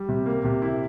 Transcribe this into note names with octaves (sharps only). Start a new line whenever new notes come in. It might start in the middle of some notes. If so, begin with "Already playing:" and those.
Already playing: G3
C3
A#3
C3
E4